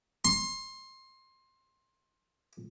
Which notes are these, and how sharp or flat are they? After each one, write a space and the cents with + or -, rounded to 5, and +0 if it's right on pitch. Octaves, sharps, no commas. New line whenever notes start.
C6 +20